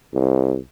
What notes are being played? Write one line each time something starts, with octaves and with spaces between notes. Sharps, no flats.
C2